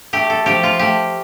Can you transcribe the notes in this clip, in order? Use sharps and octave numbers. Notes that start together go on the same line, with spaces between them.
A3 G4
A4
F3 G4
F4
A3 G4